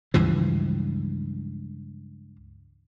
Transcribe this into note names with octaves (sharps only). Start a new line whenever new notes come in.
C#2 G2 E3 F3